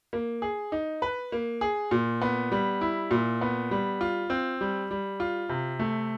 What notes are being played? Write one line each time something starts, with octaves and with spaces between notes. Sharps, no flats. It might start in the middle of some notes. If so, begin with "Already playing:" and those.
A#3
G#4
D#4
B4
A#3
G#4
A#2
B3
G3
E4
A#2
B3
G3
F4
C4
G3
G3
F4
C3
A3